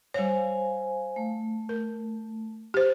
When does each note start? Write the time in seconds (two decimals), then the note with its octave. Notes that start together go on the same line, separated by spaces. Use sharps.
0.14 G3 C5 C#5 F5 G#5
1.16 A3
1.69 A#4
2.74 G4 C5